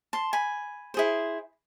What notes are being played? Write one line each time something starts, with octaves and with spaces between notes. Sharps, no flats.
A5 C6
G#5 B5
E4 G#4 C5